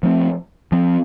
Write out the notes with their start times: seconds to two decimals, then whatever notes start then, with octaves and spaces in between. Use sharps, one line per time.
0.03 F3 A3 C4
0.72 F3 C4